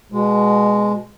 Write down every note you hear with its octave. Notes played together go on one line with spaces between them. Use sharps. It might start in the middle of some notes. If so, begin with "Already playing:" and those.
B2 G#3